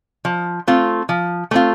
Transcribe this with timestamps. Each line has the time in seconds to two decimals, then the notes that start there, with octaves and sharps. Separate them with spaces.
0.25 F3
0.67 A3 C4 F4
1.09 F3
1.51 A3 C4 F4